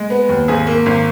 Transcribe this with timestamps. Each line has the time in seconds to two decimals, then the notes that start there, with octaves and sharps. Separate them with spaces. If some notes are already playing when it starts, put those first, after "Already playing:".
Already playing: G#3
0.10 B3
0.29 D#2
0.48 G#1 G#4
0.67 A#3
0.86 G#1